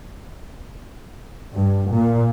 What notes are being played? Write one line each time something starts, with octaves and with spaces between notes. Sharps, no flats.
G2
A#2